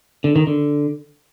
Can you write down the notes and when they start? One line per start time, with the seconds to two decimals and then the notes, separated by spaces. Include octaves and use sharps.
0.24 D3
0.36 D#3
0.47 D3